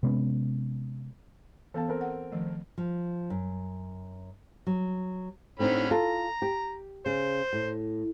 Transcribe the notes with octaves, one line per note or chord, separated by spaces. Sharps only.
C3 G#3 B3 C#4
E3 B3 A4 F5 A5
C4 A4 A#4
F#5
D#3 F3 A3
F3
F#2
F#3
A2 D3 C4 C#4 D#4 B5
F4 A4 A#5
G4
C#3 C5
A2